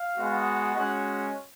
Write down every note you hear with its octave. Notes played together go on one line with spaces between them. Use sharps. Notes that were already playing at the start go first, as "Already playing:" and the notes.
Already playing: F5
G#3 B3 F#4
G#3 C#4 F#4 F#5